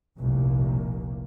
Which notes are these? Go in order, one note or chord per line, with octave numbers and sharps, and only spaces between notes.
F1 C2 A#2 A#3